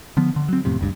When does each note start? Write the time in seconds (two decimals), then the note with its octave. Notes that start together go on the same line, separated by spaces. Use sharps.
0.17 D3 F3 B3
0.36 D3
0.48 F#3 C4
0.65 F2 A2 C3
0.79 F#1 C#2 G2